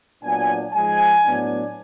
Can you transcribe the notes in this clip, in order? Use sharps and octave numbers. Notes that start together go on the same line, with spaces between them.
A#2 F#3 B3 D4 G#5
G#2 F3 G#3 G#5
A2 F#3 B3 D4